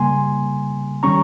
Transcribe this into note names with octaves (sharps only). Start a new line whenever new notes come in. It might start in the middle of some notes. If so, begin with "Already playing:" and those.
Already playing: C#3 G3 A#3 G#5 C6
D#3 G3 C#4 A#5 C#6